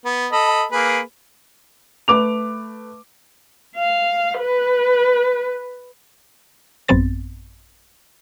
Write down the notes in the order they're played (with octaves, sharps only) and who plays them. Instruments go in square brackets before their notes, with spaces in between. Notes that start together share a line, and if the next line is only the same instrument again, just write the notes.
[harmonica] B3
A4 D#5 B5
A#3 G#4 B4
[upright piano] A3 B4 D6 F7
[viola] F5
B4
[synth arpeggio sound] A1 F#2 B3 C4 A6